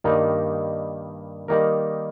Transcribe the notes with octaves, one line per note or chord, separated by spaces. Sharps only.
G2 D#3 G3 A#3 D#4
D#3 G3 A#3 D#4 A#4